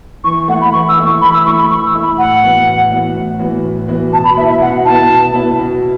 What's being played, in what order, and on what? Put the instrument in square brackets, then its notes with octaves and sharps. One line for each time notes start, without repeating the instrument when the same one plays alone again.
[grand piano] E3 [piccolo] C#6
[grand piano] A3 E4 [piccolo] F#5
[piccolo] B5
[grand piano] E3 [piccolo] C#6
[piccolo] E6
[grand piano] A3 E4
[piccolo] C#6
[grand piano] E3 [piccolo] B5
[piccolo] E6
[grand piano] A3 E4 [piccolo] C#6
[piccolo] B5
[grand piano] E3 [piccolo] C#6
[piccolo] E6
[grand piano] A3 E4
[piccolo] B5
[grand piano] A2 [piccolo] F#5
[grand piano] E3 B3 F#4
A2
E3 B3 F#4
A2
E3 B3 F#4
A2
E3 B3 F#4
[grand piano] B2 [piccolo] A5
[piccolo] B5
[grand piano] B3 [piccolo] E5
[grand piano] E4
[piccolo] E5
[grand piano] B2 [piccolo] F#5
[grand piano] B3 E4 [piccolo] A5
[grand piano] B2
B3 E4
B2